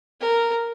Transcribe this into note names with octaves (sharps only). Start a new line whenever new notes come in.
A#4